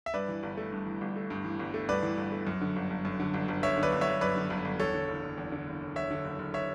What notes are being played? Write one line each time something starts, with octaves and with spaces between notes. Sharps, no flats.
E5
G2 B4 D5
E3
G1
A3
G2
E3
G1
A3
G2
E3
G1
A3
G2 B4 D5
E3
G1
A3
F#2
D3
G1
G1
F#2
D3
G1
G1
F#2 C#5 E5
D3
B4 D5
G1
C#5 E5
G1
F#2 B4 D5
D3
G1
G1
E2 A4 C#5
D3
F#1
F#1
E2
D3
F#1
F#1
E2 C#5 E5
D3
F#1
F#1
C#5 E5